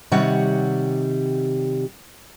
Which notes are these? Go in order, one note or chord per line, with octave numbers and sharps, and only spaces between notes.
C3 D#3 G3 C#5 F#5